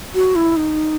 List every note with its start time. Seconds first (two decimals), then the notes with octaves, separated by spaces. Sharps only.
0.14 F#4
0.36 E4
0.57 D#4